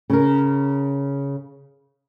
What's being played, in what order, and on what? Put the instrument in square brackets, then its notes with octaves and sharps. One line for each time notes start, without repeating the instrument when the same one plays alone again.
[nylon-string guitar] C#3 A#4